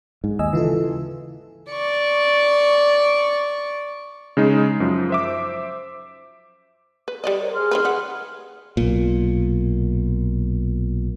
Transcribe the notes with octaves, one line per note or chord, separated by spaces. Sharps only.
G#2
D#2 D#5 G#5 E6
C#3 E3 F4 A4
D5 C#6
C#3 G#3 D#4
F#2 F3
C5 E5 D6
B4
G3 D5 D#5
A#4 C5 C#5
G#4 C6 F6
D#3 C4 B4
B4 F#5
B1 A#2